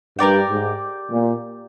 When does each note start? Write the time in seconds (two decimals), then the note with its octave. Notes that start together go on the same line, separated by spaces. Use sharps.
0.18 G2 G4 A#4 D5 G5
0.49 G#2
1.10 A#2